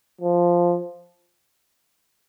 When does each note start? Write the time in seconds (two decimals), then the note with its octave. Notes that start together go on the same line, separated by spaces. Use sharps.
0.21 F3